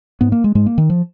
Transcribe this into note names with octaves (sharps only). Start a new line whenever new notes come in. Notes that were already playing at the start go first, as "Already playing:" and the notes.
G#2 B3
A#3
G#3
G#2 G#3
A#3
D#3
F3